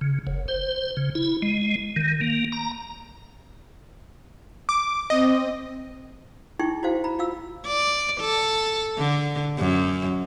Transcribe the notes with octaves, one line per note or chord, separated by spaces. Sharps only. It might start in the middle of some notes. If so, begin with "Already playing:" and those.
C#3
F#1
C5
C#3
E4
G#3
D#3
A#3
A#5
D6
C4 D#5
D#4 E4 G#4 G5 C#6
E4 F#4 C5 F5
A#5 B5
F4 F5 E6
D5
A4
D3
F#2